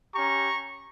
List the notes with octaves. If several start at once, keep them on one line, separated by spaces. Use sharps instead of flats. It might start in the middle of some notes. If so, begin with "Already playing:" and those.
C#4 G4 A#5 C#6